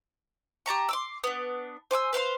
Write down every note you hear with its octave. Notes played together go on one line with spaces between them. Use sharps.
G4 A5 A#5 C#6
C6 D6 E6
B3 D4
C5 G#5 D6 E6
B4 C5 F5 C6